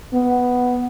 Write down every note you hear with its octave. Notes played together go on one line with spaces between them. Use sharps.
B3